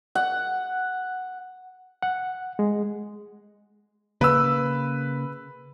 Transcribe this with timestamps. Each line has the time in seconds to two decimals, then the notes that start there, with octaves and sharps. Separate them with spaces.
0.15 F#5
2.02 F#5
2.59 G#3
4.21 C#3 A#3 B4 E6